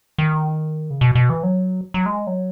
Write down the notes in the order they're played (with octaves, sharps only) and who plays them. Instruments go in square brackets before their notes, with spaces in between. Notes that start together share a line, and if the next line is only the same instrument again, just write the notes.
[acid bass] D#3
C#3
B2
B2
E3
F#3
F#3
G#3
F#3